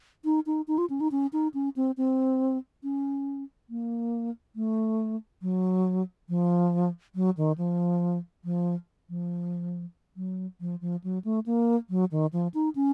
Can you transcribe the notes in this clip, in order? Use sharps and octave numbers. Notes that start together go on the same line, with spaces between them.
D#4
D#4
D#4
F4
C#4
D#4
C#4
D#4
C#4
C4
C4
C#4
A#3
A3
F#3
F3
F#3
D#3
F3
F3
F3
F#3
F3
F3
F#3
A3
A#3
F#3
D#3
F3
D#4
C#4